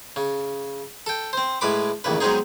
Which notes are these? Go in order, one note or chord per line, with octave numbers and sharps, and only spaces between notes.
C#3
A4 G5
C4 C5
A2 G#3 B4 B5 D6
A1 D#2 C#3 B4
F#3 G#3 B3 C4 D#4 G#4